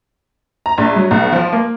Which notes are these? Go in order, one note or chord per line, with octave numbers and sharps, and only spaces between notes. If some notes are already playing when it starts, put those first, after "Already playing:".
A#5
A#1
F#3
B1
F3
A#3